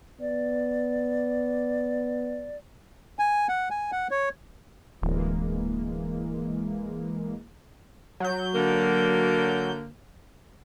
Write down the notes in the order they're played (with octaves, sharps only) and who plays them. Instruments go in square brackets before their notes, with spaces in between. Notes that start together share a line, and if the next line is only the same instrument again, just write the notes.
[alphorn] B3 [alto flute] D5
[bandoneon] G#5
F#5
G#5
F#5
C#5
[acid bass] D1 [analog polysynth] E3 G#3 A#3
[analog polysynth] F#3 G6
[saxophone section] D3 A#3